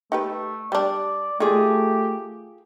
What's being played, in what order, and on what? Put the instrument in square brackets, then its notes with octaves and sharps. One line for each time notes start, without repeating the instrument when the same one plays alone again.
[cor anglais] A3 [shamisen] D#4 G4 B4
[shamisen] G3 D4 [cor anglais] D5
[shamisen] D#3 [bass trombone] A3 [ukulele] F4 G#4 [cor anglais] G4